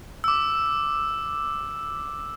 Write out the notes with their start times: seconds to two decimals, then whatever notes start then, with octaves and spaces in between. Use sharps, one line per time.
0.24 D6 E6